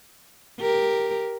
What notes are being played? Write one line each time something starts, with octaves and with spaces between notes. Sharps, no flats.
G4 A#4